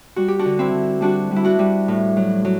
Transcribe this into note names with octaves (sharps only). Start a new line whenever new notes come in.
G3 F#4
G4
D4 F#4
D3
C4 E4
D3
G3 D4 F#4
G3
E4
D4 F#4
G3
A2
F#3
F#3